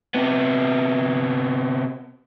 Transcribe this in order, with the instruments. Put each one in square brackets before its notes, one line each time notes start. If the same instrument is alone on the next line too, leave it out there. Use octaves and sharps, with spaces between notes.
[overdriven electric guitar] C3 B3